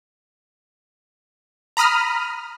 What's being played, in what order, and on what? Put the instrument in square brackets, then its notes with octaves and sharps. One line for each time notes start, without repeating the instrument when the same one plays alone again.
[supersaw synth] A#5 B5 D#6 F6